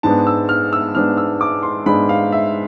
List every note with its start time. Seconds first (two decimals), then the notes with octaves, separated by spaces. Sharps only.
0.03 G#2 G#3 B3 D4 A5
0.27 E6
0.49 F6
0.73 E6
0.95 G#2 G#3 B3 D4 F6
1.17 E6
1.41 D6
1.63 C6
1.86 G#2 G#3 B3 D4 B5
2.09 F5
2.32 E5